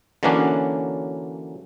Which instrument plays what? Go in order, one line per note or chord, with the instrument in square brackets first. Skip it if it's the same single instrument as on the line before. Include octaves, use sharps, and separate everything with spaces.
[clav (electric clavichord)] D3 E3 F#3 A#3 C#4 D4